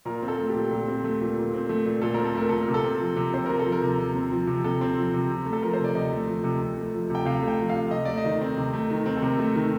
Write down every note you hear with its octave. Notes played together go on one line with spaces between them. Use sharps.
A#2 A#4
C4
A4
A3
G4
A#2
A#2 G4
C4
A3
A#2
A#2
C4
A3
A#2
A#2 A4
C4 A#4
A4
A3 A#4
A#2 A4
A#4
C3
A4
C4
F3
C3
C3 C5
C4 A#4
A4
F3
A#4
C3
C3
C4
F3
C3
C3 A4
C4
F3
C3
C3
A3
A4
F3 A#4
C5
C3 D5
C3 D#5
A3
F3
C3
C3
A3
F3
C3 G5
C3 F5
A3
G5
F3
F5
C3
C3 D#5
A3 D5
D#5
D#3
C4
C3
A3
D#3
C4
A4
C3 A#4
A3
D#3